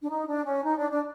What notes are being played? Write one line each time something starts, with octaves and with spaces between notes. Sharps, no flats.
D4
D#4
D4
C#4
D#4
D4
D4